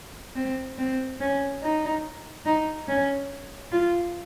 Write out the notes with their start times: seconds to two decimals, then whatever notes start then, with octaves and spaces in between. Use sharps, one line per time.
0.35 C4
0.78 C4
1.20 C#4
1.62 D#4
2.46 D#4
2.88 C#4
3.72 F4